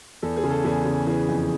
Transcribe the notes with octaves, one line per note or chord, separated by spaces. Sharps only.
E2 A4
G#4
C#3
A4
E2 G#4
C#3
E3 G#4
F2